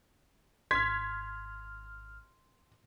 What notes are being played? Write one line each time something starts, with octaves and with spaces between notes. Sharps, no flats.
G#1 C6 F6 G#6 B6